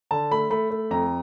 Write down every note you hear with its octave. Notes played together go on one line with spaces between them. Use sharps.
D3 A5
A3 B5
A3 B5
A3
F2 A#5